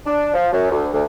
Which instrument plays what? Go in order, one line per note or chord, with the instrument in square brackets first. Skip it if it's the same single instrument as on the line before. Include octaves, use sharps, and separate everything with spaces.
[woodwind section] D4
F3
F#2
D2
D2